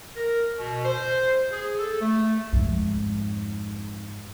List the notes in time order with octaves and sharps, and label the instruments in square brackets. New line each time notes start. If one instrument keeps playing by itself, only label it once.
[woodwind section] A#4
B2
C5
G#4
A4
A3
[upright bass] F2 G#2